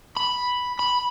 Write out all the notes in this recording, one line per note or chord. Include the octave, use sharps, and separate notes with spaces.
B5
B5